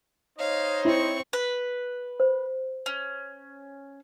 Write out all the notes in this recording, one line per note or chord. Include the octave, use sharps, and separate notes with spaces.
D#4 C5 C#5 D#5 F5
C4 E4 C#6
B4
C5
C#4